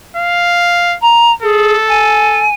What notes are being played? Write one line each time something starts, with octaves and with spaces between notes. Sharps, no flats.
F5
A#5
G#4 A4
G#5